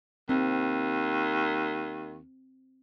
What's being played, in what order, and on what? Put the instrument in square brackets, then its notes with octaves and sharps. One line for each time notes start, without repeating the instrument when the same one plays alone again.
[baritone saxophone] D#2 [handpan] C4